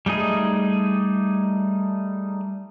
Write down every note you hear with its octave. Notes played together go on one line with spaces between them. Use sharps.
G3 A3 D#4 G#4